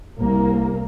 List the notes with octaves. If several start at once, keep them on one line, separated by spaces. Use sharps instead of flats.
C2 A#3